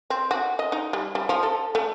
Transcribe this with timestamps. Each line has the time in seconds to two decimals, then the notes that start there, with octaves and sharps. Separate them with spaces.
0.10 C4
0.31 F#4
0.59 D#5
0.72 D#4
0.93 G3
1.15 G3
1.29 F3
1.43 A4
1.75 A3